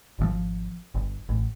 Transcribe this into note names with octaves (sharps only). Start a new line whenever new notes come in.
G#1 C3 F3
G1
A1